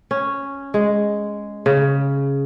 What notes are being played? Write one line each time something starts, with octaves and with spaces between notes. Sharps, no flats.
C#4
G#3
C#3